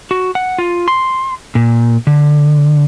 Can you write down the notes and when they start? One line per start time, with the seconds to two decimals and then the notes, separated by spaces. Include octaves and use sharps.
0.11 F#4
0.35 F#5
0.58 F4
0.88 C6
1.55 A#2
2.07 D3